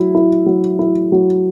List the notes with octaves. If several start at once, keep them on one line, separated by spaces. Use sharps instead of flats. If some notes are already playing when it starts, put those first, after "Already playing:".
Already playing: F#3 E4
E4
F#3
E4
F#3